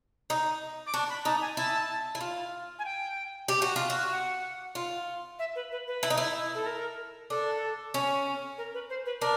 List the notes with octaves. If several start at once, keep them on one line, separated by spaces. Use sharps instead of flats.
D#4
D6
D4 C#6
B5
D#4 A5
G#5
E4 A5
E4
F4
G#5
G5
G4
F#4
F4
F#4
F#5
F4
E5
B4
B4
B4
E4
D#4
E4
A4
A#4
D4 A4
C#4
A#4
B4
C5
B4
D4 A#4